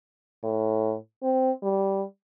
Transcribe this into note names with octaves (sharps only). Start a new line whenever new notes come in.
A2
C4
G3